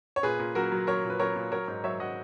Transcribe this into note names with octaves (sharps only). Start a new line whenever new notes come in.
C#5
A#2 G#4 B4
A#2
F#3 F#4 A#4
F#3
F#3 A#4 C#5
A#2
B4
F#3 A#4 C#5
A#2
F#3 A#4 C#5
G#2
F#3 C#5 E5
F#3 D#5 F#5